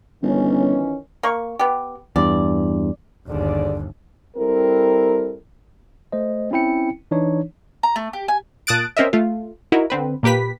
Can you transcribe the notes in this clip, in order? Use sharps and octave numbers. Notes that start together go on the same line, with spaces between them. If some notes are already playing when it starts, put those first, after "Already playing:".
G1 D#3 E3 C#4
A#3 C#6
B3 G4
E2 G2 D5
G1 D#2 D3 G#4 D5
G3 C4 E4 A4 A#4
A3 C5 D#5
C4 C#4 E4 G5 C#7
E3 D4 D#4 C#5
A#5
A3
G4
G#5
A#2 A5 D#6 F#6 A6 D7
C4 C#4 A#4 D#5 E5
A3 F4
D#4 E4 F#4 A#4
D3 C4 B4
A#2 A#3 G4 B4 B6